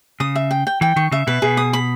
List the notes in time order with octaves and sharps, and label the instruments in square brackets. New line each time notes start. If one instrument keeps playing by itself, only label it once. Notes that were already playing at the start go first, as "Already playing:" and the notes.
[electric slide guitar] C#3 [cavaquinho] D#6
[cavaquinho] E5
G5
G5
[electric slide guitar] E3 [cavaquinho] G5
[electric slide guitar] D#3 [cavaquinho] C#6
[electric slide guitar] C#3 [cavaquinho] E5
[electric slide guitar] B2 [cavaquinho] B4
[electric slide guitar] B2 [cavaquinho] G#4
[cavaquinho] D#6
B5